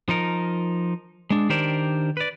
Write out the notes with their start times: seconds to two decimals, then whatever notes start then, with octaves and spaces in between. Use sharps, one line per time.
0.09 F3 D#4 A#4
1.30 G#3 D4
1.49 D#3 D4 G4 A#4 C5 D5
2.17 B4 D5